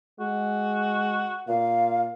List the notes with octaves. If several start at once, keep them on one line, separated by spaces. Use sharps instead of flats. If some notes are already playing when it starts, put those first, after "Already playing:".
G#3 F#4
A#2 F5